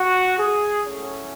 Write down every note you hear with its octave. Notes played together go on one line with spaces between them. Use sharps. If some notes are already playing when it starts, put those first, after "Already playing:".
Already playing: F#4
G#4
A2 F#3 A3 C#4